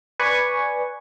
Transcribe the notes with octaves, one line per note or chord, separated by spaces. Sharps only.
B4 D5 G#5 C#6